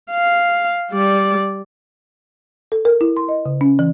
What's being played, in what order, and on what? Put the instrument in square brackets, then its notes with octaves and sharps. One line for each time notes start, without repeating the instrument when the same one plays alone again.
[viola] F5
G3 D5
[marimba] A4
A#4
E4
C6
D#5
C#3
C#4
E3